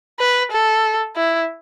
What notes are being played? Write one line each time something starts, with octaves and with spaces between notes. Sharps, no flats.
B4
A4
E4